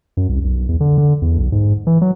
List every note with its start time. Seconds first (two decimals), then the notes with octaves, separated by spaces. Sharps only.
0.17 F#2
0.29 C2
0.44 B1
0.69 E2
0.80 D3
0.98 D3
1.22 E2
1.38 B1
1.52 G#2
1.87 E3
2.01 F#3